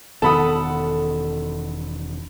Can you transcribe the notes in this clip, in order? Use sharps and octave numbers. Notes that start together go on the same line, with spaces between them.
E1 D#3 B3 A4 F#5 A5 B5 D#6